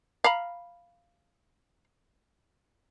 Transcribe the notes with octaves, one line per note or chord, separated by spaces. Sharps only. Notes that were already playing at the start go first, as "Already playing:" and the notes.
F5 A#5 B5